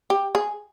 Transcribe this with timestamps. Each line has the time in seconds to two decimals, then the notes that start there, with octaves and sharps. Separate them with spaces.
0.10 G4
0.35 G#4